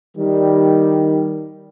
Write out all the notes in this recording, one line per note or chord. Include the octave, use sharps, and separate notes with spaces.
D#3 G3